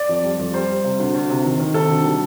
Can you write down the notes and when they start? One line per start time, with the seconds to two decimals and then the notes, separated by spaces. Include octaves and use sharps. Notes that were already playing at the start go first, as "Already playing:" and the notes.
Already playing: D5
0.09 F2
0.23 G3
0.39 F2
0.54 G3 C5
0.69 G3
0.84 C3
0.99 D2
1.14 D2
1.29 C3
1.44 D#3
1.60 D#3
1.74 C3 A4
1.90 D2
2.04 G3